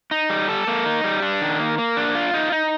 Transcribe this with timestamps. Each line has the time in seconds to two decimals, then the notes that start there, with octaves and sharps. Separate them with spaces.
0.11 D#4
0.30 G3
0.49 A4
0.67 A#3
0.86 D#4
1.04 G3
1.22 D4
1.41 D#3
1.59 A#3
1.78 A#3
1.97 D4
2.15 F4
2.34 D#4
2.52 D#4